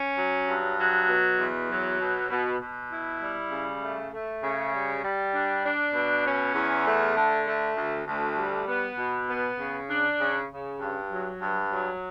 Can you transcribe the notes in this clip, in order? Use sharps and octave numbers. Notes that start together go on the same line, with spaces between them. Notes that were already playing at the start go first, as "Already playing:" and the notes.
Already playing: C#4
F#3
G2
F#3
B2
E2
F#3
B2
B2
B2
E4
G3
C#3
A3
A3
C#3
G3
G3
D4
D4
B2
C#4
E2
A3
D3
A3
D2
D2
G3
B3
B2
B3
C#3
D4
C#3
C#3
G2
F#3
G2
F#3